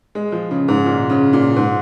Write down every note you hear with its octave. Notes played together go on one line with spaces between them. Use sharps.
G#3
F3
C#3
G#2
A#2
C#3
A#2
G#2